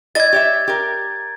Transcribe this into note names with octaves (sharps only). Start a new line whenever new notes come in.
E4 D5 D#5 G#6 A6
G4 C#5 E5
G4 A#4